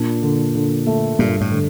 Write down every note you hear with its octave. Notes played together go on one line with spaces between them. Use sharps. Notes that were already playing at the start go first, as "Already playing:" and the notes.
Already playing: A#2 D4
D3
D3
A3
G2 A#2
A2
D3